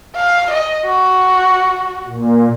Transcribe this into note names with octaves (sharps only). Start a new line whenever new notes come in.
F5
D#5
F#4
A#2